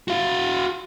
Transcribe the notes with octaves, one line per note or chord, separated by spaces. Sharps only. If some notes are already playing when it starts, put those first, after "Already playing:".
F#4 F5